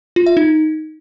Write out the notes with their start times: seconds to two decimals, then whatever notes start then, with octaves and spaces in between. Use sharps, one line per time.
0.16 F4
0.26 E5
0.37 D#4